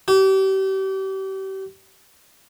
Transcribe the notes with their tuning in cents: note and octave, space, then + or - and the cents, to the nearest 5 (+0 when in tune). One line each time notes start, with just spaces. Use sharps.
G4 -35